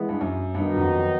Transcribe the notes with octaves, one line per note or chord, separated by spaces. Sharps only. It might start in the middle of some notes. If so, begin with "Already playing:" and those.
Already playing: E3 G#3 B3
G2
F#2
G2 D#3 F#3 B3 D#4 F#4
F2